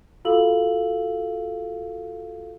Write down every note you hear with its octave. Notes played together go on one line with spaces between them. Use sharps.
F4 F#4 A4 F5 E6 F#7